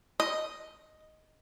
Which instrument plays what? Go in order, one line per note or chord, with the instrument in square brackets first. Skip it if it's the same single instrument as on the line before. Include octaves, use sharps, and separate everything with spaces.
[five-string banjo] D#5